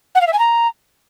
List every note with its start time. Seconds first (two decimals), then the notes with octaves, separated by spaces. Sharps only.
0.15 F#5
0.21 F5
0.27 E5
0.33 G#5
0.39 A#5